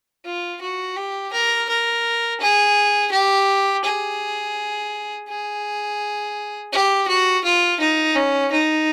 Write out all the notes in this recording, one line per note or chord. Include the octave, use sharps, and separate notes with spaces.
F4
F#4
G4
A#4
A#4
G#4
G4
G#4
G#4
G4
F#4
F4
D#4
C#4
D#4